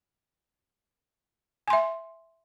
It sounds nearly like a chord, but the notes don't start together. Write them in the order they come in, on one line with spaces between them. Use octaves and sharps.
G#5 C6 E5